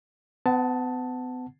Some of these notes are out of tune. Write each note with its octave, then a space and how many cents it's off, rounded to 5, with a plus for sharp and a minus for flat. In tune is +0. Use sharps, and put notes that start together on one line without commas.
B3 +40 F#5 +0 A5 +0